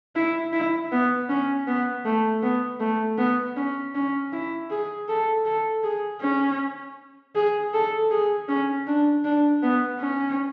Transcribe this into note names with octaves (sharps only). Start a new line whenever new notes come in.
E4
E4
B3
C#4
B3
A3
B3
A3
B3
C#4
C#4
E4
G#4
A4
A4
G#4
C#4
G#4
A4
G#4
C#4
D4
D4
B3
C#4